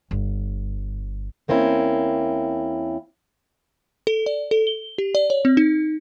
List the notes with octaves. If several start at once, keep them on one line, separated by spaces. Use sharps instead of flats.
G1
E2 A#3 C4 C#4 E4
A4
D5
A4
G7
G4
D5
C#5
C4
D#4